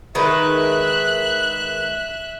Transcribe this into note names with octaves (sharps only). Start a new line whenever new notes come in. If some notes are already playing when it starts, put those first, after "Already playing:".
D#3 G#3 B4 E5 F#6